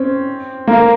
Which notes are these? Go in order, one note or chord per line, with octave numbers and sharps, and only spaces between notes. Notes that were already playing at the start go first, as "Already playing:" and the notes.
Already playing: C4 C#4
A#3